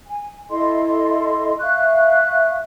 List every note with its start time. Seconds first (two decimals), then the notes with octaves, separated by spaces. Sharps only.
0.08 G#5
0.51 E4 A4 D#5 C6
1.60 E5 F5 C#6 F#6